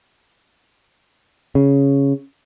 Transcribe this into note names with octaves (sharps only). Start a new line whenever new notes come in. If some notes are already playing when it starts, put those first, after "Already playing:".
C#3